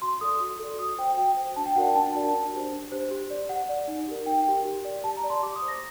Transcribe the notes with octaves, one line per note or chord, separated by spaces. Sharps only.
F#4 C6
A4 D5 D#6
F#4
A4 D5
F#4 D#6
C5 G5
F#4 G5
C5
D4 A5
G5
F#4 A#4 D5 F#5
G5
D4 A5
F#4 A#4 D5
D4
G4 C5
D4
G4 C5
G4
D5
G4 F#5
D5
D#4
G4 A#4
D#4 G5
G4 A#4
G4
D5
G4 A5
A#5
D5
C6
G4 D6
D#6
C5
A#6